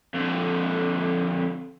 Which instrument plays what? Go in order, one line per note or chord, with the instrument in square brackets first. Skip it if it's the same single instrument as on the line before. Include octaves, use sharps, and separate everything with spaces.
[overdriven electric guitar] F2 D3